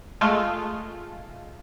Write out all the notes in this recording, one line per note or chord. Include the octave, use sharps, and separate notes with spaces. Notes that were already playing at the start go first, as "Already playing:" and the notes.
G#3 A3 F4